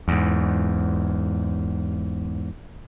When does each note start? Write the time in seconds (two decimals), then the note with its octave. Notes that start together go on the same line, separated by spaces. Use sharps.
0.08 E2 G#2